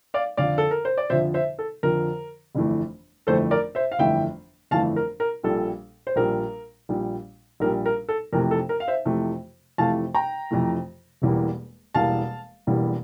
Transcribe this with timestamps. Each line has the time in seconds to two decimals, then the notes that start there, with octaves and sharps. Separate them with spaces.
0.14 D5 F5
0.37 F2 D3 F3 D5 F5
0.58 A4
0.71 A#4
0.85 C5
0.98 D5
1.10 F2 D3 F3 C5 E5
1.34 C5 E5
1.59 A4
1.83 F2 D3 F3 A#4
2.55 G1 F2 E3 A3
3.27 G1 F2 E3 A3 A4 C5
3.51 A#4 D5
3.75 C5 E5
3.92 F5
3.99 G1 F2 E3 A3 E5 G5
4.71 G1 F2 E3 A3 F5 A5
4.96 A#4
5.20 A#4
5.43 A#1 A#2 G3 A4
6.07 C5
6.16 A#1 A#2 G3 A#4
6.89 A#1 A#2 G3
7.60 A#1 A#2 G3 A#4
7.86 A#4
8.09 A4
8.33 F2 C3 E3 A3 A#4
8.51 A4
8.69 A#4
8.80 F5
8.88 C5 E5
9.05 F2 C3 E3 A3
9.78 F2 C3 E3 A3 F5 A5
10.14 G5 A#5
10.51 F2 C3 E3 A3
11.22 E1 E2 E3 G3 A#3
11.94 E1 E2 E3 G3 A#3 F5 A5
12.67 E1 E2 E3 G3 A#3